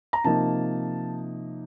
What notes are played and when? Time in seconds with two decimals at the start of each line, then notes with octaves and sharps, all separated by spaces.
0.13 A#5
0.24 C3 F3 A#3 D#4 A5